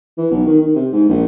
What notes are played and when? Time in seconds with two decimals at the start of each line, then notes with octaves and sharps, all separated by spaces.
0.18 E3
0.31 B1
0.46 D#3
0.62 D#3
0.76 C3
0.93 G#2
1.09 A#1